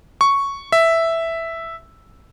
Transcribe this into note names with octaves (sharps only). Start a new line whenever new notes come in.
C#6
E5